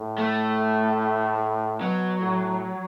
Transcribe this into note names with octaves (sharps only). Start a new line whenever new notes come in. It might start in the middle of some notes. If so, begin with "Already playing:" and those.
Already playing: A2
A3
B2 F#3
A2